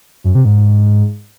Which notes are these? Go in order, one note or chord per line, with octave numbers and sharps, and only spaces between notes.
F#2
C3
G#2